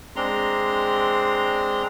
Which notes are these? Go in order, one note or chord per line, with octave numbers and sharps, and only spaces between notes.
G#3 C4 D4 A#5 C6